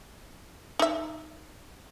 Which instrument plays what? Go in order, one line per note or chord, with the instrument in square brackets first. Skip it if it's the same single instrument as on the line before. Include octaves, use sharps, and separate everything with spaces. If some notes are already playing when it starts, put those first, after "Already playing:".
[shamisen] D#4 E5